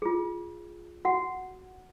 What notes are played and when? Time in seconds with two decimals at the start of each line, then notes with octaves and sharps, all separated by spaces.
0.02 F4 G#4
1.05 F#4 F#5